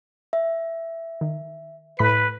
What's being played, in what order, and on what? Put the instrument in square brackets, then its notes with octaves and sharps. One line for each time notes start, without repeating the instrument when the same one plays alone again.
[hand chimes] E5
[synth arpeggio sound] D#3
[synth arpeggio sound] A2 B5 B6 [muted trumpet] B4